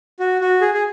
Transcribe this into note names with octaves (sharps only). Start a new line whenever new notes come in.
F#4
F#4
G#4
G#4